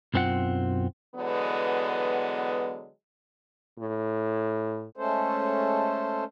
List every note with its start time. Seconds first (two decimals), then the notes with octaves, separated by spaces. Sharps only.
0.14 B1 F#2 C4 F4 F#5
1.15 D3 E3 F#3 G#3 B3
3.79 A2
4.96 G#3 A3 C#4 A4 C5